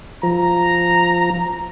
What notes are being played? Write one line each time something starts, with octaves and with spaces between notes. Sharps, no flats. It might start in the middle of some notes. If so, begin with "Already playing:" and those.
F3 A#5